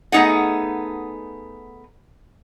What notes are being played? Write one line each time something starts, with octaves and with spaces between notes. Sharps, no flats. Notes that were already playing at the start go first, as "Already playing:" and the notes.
A3 B3 D#4 G#4 F#5